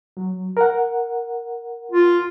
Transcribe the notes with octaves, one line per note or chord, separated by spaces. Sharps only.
F#3
A#4 F#5
F4